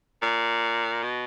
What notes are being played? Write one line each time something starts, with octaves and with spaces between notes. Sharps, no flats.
A#2
B2